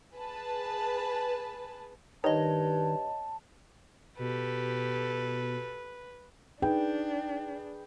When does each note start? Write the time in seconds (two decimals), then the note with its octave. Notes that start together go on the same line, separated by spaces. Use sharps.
0.14 G#4 B4 A5
2.24 G2 D#3 C#5 D#5 A5
4.19 B2 G4 A4 B4
6.62 D4 D#4 G#4 B4 G5